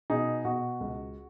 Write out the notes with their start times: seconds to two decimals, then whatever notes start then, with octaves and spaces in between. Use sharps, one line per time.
0.10 B2 D#4 G#4
0.45 B2 F#4
0.81 C#2